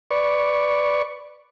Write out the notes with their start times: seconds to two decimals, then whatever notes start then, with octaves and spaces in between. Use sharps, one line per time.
0.11 B4 D5 C#6